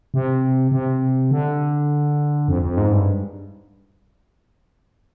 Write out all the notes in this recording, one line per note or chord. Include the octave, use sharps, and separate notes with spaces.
C3
C3
D3
F2
F2
G#2
G2